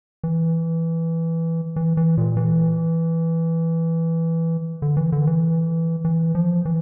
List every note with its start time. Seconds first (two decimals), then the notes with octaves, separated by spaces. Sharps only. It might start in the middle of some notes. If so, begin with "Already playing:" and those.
0.24 E3
1.76 E3
1.97 E3
2.17 A#2
2.37 E3
4.82 D3
4.97 E3
5.12 D3
5.27 E3
6.05 E3
6.35 F3
6.65 E3